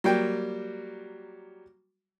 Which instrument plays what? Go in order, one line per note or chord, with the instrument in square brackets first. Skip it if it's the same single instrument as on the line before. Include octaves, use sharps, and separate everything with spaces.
[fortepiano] F#3 G3 A#3 G5